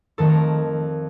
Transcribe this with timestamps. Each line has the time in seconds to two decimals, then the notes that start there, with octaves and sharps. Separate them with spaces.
0.18 F2 D#3 A3 A4
0.29 A#4